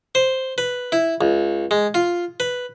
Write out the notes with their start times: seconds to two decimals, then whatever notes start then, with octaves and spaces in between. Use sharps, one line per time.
0.15 C5
0.58 B4
0.92 E4
1.21 C#2
1.71 G#3
1.94 F4
2.40 B4